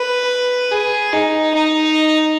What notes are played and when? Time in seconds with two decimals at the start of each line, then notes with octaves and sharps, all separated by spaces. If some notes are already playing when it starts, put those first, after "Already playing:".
Already playing: B4
0.71 G#4
1.13 D#4
1.54 D#4